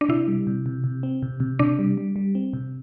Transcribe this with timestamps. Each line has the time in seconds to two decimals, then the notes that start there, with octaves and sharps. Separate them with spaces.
0.01 D4
0.09 C3 E4
0.28 G3
0.47 C3
0.66 C3
0.84 C3
1.03 C4
1.23 C3
1.40 C3
1.59 C3 D4
1.79 G3
1.98 G3
2.16 G3
2.35 C4
2.53 C3